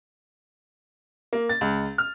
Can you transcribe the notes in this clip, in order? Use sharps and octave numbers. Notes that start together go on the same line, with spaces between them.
A#3
A6
C#2
F6